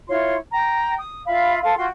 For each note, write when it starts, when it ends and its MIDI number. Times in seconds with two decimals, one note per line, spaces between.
0.08 0.35 64
0.08 0.35 65
0.08 0.35 73
0.08 0.35 84
0.52 0.96 79
0.52 0.96 82
0.98 1.23 87
1.26 1.59 65
1.26 1.59 76
1.26 1.59 77
1.26 1.59 83
1.62 1.76 69
1.62 1.76 77
1.62 1.76 84
1.76 1.87 65
1.76 1.87 66
1.76 1.87 79
1.76 1.87 84